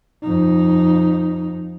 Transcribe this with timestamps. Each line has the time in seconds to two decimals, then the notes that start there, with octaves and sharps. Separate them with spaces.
0.23 F2 D#4